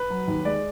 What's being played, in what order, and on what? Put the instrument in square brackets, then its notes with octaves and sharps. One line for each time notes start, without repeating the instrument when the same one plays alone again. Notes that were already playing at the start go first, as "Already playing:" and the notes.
Already playing: [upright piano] B4
F#3
D#2
G#3 D5